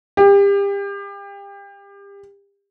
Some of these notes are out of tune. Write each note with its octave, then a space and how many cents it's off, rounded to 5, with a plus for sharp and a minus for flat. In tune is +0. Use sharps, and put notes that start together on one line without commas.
G4 +30